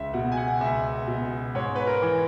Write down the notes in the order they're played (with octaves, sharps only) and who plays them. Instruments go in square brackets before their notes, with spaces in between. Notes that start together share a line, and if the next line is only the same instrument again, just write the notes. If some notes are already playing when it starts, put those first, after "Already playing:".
Already playing: [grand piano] C#2 E5
B2 F#5
G#5
F#5
C#2 E5
B2
G#2 C#5
B4
A#4
E3